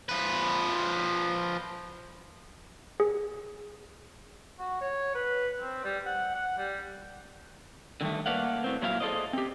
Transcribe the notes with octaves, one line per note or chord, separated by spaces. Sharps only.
F3 B4
G#4
F#4
C#5
B4
C4
G3
F#5
F#5
G3
D3 D#3 G3 A3
A3 A#3 B4 D5 F5 F#5
A2 C4
A#2 F#3 E4 A4 F5
G#4 A4 C5 D5 D#5
C4 G4